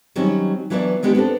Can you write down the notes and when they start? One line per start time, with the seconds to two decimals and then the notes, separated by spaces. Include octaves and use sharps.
0.16 D#3 F#3 G3 C4 C#4
0.70 E3 F#3 B3 D4 C5 D5
1.03 D#3 G#3 B3 D4 G4
1.15 B3 C4 D4 A4